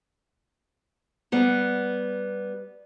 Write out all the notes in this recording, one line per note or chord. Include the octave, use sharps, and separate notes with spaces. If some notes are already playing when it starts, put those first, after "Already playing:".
G3 B3